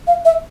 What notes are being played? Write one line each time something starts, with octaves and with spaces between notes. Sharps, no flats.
F5
E5